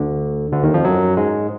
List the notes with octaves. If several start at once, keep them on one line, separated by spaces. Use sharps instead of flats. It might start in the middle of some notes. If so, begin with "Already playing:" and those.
Already playing: D2 D3
D2 D3
D#2 D#3
F2 F3
F#2 F#3
G#2 G#3